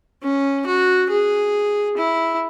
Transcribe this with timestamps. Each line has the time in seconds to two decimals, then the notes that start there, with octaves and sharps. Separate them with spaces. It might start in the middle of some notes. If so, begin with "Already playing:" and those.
0.23 C#4
0.66 F#4
1.10 G#4
1.97 E4